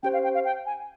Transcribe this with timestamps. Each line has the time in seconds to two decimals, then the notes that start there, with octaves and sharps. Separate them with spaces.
0.03 C#4 G4 C5 G5
0.13 F5
0.24 G5
0.34 F5
0.45 G5
0.66 G#5